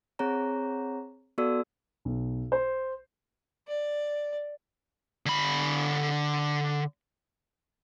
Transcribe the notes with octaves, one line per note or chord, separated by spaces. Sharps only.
C4 G#4 C#5 A#5
B3 F#4 A4 D5 E6
B1
C5
D5
D3 B5